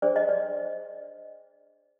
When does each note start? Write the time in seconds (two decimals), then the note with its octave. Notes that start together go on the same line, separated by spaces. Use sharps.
0.02 D4 G#4 C5 D5
0.16 D#5
0.29 D5